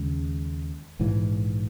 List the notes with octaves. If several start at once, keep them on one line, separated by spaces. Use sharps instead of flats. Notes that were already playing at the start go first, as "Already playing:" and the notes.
Already playing: D#2 C#3 G#3
A#1 G#2 E3